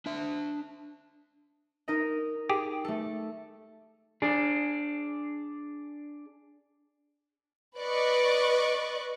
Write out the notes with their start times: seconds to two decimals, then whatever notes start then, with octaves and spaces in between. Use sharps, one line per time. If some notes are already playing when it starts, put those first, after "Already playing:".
0.06 D4 E5
1.88 D#4 A#4 D#5
2.49 G4 G#4
2.85 A3 A4
4.22 D4 G#4
7.77 B4 D5 D#5 C#6 D6 F#6